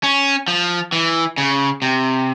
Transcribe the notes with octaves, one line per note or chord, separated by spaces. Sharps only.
C#4
F3
E3
C#3
C3